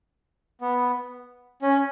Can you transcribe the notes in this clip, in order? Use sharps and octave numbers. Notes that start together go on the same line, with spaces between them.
B3
C#4